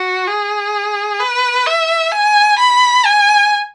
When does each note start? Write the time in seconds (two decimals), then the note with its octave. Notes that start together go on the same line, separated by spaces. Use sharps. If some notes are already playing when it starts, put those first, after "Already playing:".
Already playing: F#4
0.28 G#4
1.20 B4
1.66 E5
2.12 G#5
2.59 B5
3.05 G#5